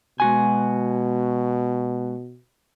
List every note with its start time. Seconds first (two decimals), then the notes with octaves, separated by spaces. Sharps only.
0.20 B2 G#3 F#4 G#5